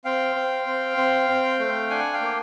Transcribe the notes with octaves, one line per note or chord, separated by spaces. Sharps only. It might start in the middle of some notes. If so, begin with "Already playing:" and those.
C4 F5 G5
C4
C4
C4
C4
A3
D4 F#5 G#5
F5 G5
A#3